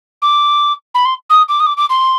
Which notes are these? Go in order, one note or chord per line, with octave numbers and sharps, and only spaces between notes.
D6
B5
C6
D#6
D6
D#6
D6
D6
C6